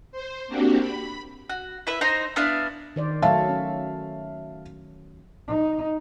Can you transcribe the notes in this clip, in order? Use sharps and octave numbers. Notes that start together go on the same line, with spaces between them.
C5
A#3 C4 D4 F#4 G4
B5
F#4
E4 B4 E5
D#4 C5 A#5
B3 D4 E4 F5
D#3 C5 D5
F#3 A3 C#5 E5 F5 A5
C#4
D#4